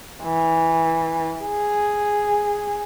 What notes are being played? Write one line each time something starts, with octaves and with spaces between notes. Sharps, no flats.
E3
G#4